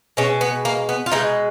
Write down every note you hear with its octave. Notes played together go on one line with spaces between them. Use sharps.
B2 G#3 C#4
B3
A#3
B3
F4
B2 G#3 D#4